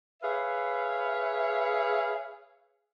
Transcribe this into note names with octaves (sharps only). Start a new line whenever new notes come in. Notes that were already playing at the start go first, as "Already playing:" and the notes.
G#4 B4 C#5 E5 F5